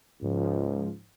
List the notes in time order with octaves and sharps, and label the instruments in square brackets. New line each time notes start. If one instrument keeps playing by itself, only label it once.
[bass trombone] C#2 [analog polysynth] G#2 F3